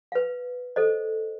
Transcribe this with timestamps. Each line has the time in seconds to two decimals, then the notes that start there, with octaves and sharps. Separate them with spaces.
0.12 B4 F5
0.76 A4 C5 D#5